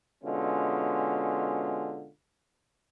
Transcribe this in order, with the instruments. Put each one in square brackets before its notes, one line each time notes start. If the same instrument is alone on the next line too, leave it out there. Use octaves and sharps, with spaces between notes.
[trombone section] B2 D3 G#3 C#4 F4